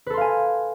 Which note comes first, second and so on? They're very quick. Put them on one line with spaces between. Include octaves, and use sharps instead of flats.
B4 A4 C6 F5 G#5